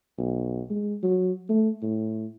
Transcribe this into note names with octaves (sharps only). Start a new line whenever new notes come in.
B1
G#3
F#3
A3
A2